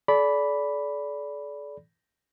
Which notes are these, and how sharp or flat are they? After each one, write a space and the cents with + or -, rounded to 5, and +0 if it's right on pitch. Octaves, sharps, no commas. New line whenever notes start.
A4 -45 D5 -20 B5 +0